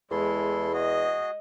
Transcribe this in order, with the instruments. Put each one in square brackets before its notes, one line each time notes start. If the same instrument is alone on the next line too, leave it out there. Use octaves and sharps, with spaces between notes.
[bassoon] E2 [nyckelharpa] G#3 [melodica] E4 A4 C6
[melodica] F#4 G#4 [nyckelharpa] D#5